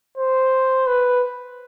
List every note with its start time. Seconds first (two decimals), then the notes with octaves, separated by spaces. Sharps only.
0.18 C5
0.87 B4